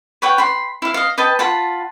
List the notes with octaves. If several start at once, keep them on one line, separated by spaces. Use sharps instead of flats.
B4 C#5 F#5 G5
B5 C6
E4 F5
D#5 F5
B4 D#5 G5 A5
F4 F#5 A5 B5